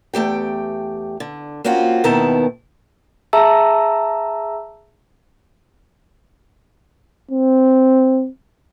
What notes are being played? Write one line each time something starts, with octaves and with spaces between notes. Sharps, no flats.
E2 A3 G4 G5
D3
A#3 C4 C#4 F4 F#4
D#2 B2 D#3 B3 E4 A5
G#4 E5 A5 A#5 E6
C4